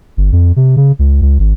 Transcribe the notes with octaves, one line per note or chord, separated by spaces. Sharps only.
G1
F2
C3
C#3
C#2
C#2
G#1